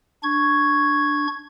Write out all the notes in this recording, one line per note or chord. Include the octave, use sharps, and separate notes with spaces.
D4 C#6 G#6